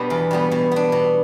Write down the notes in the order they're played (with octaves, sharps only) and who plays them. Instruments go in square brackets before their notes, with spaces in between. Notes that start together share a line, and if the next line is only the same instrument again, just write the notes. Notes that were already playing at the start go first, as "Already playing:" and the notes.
Already playing: [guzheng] B2 G3 B3 D4
E2
B2 G3 B3
B2
B3 D4
B2